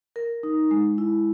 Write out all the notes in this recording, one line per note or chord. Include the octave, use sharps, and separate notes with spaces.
A#4
D#4
G#3
E4